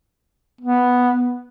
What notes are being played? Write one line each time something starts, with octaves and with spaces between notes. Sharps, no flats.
B3